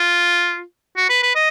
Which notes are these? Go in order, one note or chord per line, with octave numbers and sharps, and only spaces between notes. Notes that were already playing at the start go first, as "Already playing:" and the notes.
Already playing: F4
F#4
B4
B4
D#5